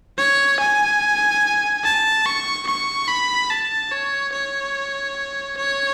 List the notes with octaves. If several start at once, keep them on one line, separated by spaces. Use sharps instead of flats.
C#5
G#5
A5
C#6
C#6
B5
A5
C#5
C#5
C#5